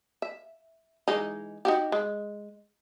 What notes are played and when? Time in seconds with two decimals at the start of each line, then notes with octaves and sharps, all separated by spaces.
0.22 E5
1.08 E3 G#3 D#4
1.65 D#4 F#4 G4
1.92 G#3